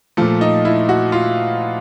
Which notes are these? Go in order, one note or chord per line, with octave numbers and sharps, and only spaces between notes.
A#2 F3 A3
D#4
E4
F#4
F4